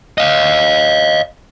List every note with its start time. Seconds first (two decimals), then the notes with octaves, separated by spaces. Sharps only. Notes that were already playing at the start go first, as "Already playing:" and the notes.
0.18 D#5 F5